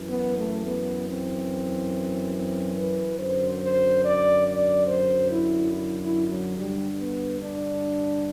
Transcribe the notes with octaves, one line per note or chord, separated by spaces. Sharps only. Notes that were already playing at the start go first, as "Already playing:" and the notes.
Already playing: F#2 E3
B3
A3
B3
C4
C4
B4
F#2 D3 C5
C5
D5
D5
C5
E4
E4
E4
F#3
G2 D3 G3
B3
D4